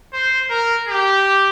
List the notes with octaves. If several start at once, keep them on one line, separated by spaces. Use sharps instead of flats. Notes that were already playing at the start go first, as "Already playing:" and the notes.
C5
A#4
G4